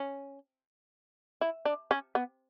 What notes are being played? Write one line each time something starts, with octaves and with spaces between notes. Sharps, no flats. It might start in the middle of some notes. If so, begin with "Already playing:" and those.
Already playing: C#4
E4
D4
C#4
B3